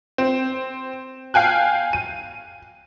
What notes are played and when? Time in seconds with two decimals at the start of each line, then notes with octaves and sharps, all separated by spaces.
0.18 C4
1.34 F5 G5 G#5 F#6
1.93 D#7